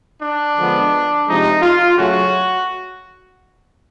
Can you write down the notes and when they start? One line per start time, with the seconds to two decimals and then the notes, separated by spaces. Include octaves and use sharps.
0.22 D4
0.57 D3 F3 G#3 B3
1.27 C3 F3 G#3 D#4
1.62 F4
1.98 C#3 F#3 A3 C#4 F#4